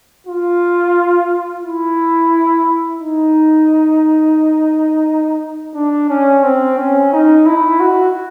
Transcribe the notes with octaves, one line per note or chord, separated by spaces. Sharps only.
F4
E4
D#4
D4
C#4
C4
C#4
D#4
E4
F#4